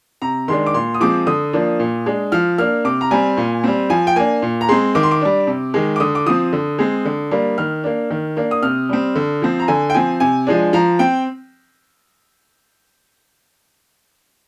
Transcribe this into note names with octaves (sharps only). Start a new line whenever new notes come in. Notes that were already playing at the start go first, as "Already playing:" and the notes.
C3 A#5
D#3 G#3 D4 C6
D6
A#2 C6
D#6
F3 G#3 C4 D6
D3 D#6
F3 A#3 D4
A#2
G#3 D4
F3 F6
A#3 D4 F6
C3 D6
A#5
G3 C4 G#5
A#2
G3 C4
F3 G#5
G5
A#3 D4 G#5
A#2
A#5
G#3 C4 C6
D#3 D6
C6
D6
G3 D4
C3
D#3 G#3
D6
D3 D#6
D6
F3 C4 D#6
D3
G#3 C4
D3
G3 A#3 D4
D#3 F6
A#3 D4
D#3
A#3 D4
D#6
C3 F6
G3 C4
D3
F3 C4
A#5
D3 G#5
G5
F3 C4 G#5
C3 G#5
F3 G#3 D4
F3 A#5
C4 G5